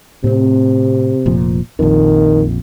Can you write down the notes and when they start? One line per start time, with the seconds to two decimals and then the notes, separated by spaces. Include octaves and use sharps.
0.24 A2 C3 C4
1.26 F1 A#2 F3
1.79 A#1 F2 D#3